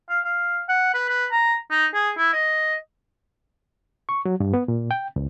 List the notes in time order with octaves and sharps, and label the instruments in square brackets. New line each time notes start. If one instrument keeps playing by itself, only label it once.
[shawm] F5
F5
F#5
B4
B4
A#5
D#4
G#4
E4
D#5
[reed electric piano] C#6
F#3
G2
B3
A#2
G5
C#2